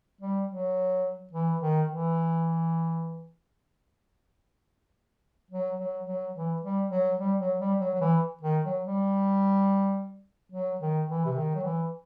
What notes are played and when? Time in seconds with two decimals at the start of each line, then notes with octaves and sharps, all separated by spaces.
0.21 G3
0.49 F#3
1.33 E3
1.61 D#3
1.88 E3
5.51 F#3
5.78 F#3
6.06 F#3
6.34 E3
6.62 G3
6.90 F#3
7.18 G3
7.39 F#3
7.59 G3
7.80 F#3
7.95 F#3
8.01 E3
8.42 D#3
8.64 F#3
8.85 G3
10.52 F#3
10.80 D#3
11.07 E3
11.25 C3
11.35 D#3
11.55 F#3
11.64 E3